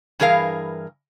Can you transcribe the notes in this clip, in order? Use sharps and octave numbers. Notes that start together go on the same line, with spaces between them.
G2 E3 G#4 A#4 F5